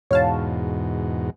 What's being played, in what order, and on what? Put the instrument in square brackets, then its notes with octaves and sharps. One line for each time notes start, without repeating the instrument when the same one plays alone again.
[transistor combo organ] E2 G#2 B2 [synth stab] C#5 F5 A5